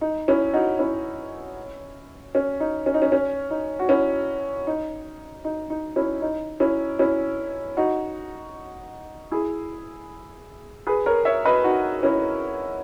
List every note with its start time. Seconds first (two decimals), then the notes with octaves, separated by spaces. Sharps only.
0.01 D#4
0.28 C#4 E4
0.54 D#4 F#4
0.79 C#4 E4
2.35 C#4
2.60 D#4
2.86 C#4
2.94 D#4
3.02 C#4
3.12 C#4
3.51 D#4
3.79 F#4
3.89 C#4 E4
4.67 D#4
5.45 D#4
5.70 D#4
5.96 C#4 E4
6.22 D#4
6.60 C#4 E4
6.99 C#4 E4
7.77 D#4 F#4
9.31 E4 G#4
10.87 G#4 B4
11.06 A#4 C#5
11.25 C#5 E5
11.45 B4 D#5
11.64 D#4 F#4
12.03 C#4 E4